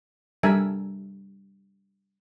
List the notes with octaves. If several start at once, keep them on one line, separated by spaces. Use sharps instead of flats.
G3 D4 A4 A#4 E5 G#5